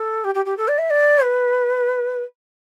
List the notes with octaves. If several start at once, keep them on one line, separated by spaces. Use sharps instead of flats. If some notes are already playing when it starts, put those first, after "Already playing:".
Already playing: A4
G4
G4
G4
A4
D5
E5
D5
B4